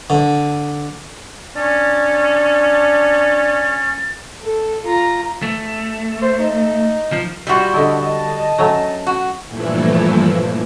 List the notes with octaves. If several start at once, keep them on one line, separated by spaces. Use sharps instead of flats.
D3
C#4 D4 A6
A4
F4 A#5
A3
C5
D#4
F3
G3 F4 F#4 E5
D3 E4 D#5 A5
D#5 A5
F#3 A3 C#4
F#4
G2 A#2 E3 F3 A3 E4